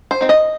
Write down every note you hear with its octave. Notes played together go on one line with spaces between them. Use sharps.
C5
C4 D#4
D#5